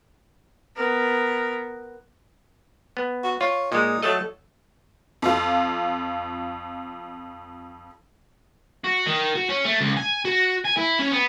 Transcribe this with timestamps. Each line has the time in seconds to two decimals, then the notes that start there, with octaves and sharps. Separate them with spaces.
0.76 B3 A#4
2.97 B3
3.24 F#4
3.41 F4 C#5
3.72 A#2 G#3 D#4
4.03 F#3 A3 A4 D#5
5.22 F2 F4
8.84 F#4
9.06 D#3
9.35 F#4
9.49 C#4
9.65 A3
9.80 C#2
9.97 G#5
10.25 F#4
10.65 G#5
10.77 E4
10.99 C#4
11.12 B3